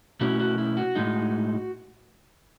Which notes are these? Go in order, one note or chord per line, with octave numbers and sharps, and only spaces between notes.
B2 A3 C#4 E4 F#4
F#4
E4
F#4
A2 G#3 D#4